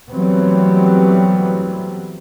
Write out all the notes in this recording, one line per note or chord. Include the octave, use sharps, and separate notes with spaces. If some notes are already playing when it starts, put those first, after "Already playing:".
E3 F#3 G3 A3 B3 C4